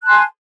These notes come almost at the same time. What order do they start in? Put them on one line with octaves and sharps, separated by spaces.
F#6 A5 C6 G#5